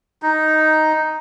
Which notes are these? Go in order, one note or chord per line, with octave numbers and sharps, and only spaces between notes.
D#4